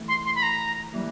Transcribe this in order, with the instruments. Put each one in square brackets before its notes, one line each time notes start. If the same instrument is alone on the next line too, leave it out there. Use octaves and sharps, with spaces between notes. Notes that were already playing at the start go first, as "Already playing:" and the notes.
Already playing: [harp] E3 A3
[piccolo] C6
C6
B5
A#5
[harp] E3 G3 A#3 D4